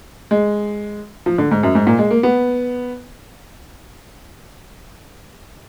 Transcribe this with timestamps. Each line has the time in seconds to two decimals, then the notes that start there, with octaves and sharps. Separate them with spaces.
0.31 G#3
1.26 F3
1.38 D3
1.51 G#2
1.63 F#2
1.75 G#2
1.87 A#2
1.99 G#3
2.10 A#3
2.23 B3